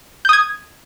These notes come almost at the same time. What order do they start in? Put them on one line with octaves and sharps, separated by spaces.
G6 D#6 G#6